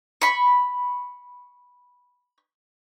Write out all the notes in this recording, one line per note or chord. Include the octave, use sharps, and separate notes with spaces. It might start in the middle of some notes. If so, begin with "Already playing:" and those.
B5 C#6